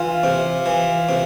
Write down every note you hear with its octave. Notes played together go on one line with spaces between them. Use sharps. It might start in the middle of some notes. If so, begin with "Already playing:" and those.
Already playing: E3 F4
C3
E3
C3